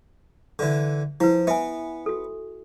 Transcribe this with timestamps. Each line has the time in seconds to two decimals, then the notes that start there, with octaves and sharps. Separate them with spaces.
0.59 D3 E3
1.20 F3 E4 B4
1.47 B3 E5 G#5
2.06 F#4 A4